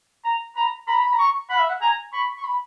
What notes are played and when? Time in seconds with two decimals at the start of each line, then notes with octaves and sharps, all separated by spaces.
0.24 A#5
0.56 A#5 B5
0.87 A#5 B5
1.01 B5
1.13 A#5
1.19 C#6
1.50 F#5 B5
1.59 E5
1.69 F#5
1.81 G#5 A#5
2.13 B5 C#6
2.38 C#6
2.44 B5